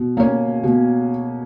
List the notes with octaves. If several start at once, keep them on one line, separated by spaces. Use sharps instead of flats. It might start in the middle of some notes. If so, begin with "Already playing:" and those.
Already playing: B2
A#3 C#4
B2